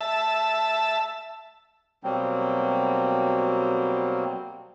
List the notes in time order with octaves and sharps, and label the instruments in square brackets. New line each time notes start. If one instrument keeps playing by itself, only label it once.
[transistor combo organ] E5 A5
[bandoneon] B2 F#3 G3 A#3 C4